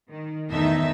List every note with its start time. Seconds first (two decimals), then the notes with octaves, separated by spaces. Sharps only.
0.10 D#3
0.51 E2 A2 D#3 D#4 E5 A5